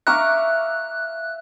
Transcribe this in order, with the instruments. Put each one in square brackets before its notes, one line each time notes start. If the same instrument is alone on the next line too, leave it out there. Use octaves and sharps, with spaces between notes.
[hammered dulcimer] E5 F5 [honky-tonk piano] A#5 C#6 D6 [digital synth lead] F#6